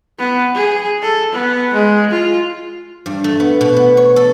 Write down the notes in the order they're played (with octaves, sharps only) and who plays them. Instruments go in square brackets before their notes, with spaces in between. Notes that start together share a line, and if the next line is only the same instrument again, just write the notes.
[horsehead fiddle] B3
G#4
A4
B3
G#3
F4
[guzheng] G2
A3
B3
B2
B3
C#5
A4